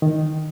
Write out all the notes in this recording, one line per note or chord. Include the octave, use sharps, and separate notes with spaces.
D#3